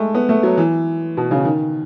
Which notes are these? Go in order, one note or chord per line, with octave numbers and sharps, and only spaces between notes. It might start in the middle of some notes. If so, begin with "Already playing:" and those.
Already playing: G#3 A3
B3
A3
F#3
E3
B2
C#3
D#3